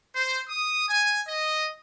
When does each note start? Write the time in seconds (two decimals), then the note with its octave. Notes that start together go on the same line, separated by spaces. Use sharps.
0.15 C5
0.49 D#6
0.89 G#5
1.28 D#5